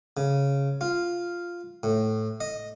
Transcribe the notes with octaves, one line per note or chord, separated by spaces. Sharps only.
C#3
F4
A2
D#5